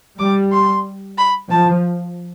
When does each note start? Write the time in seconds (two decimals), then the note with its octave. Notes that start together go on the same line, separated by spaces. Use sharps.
0.19 G3 D6
0.52 C6
1.18 B5
1.51 F3 A5